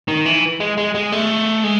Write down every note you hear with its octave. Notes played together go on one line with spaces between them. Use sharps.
D#3
E3
G#3
G#3
G#3
A3
G#3